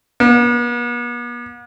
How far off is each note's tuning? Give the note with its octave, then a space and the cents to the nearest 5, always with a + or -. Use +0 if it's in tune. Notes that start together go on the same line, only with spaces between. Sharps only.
B3 -45